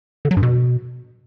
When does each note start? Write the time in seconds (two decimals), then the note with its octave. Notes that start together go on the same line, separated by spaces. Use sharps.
0.25 D3
0.31 F#3
0.37 G2
0.43 B2